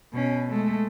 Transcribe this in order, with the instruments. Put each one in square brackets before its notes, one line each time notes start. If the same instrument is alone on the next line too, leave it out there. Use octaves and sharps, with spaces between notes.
[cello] B2 C#4
G#3 A3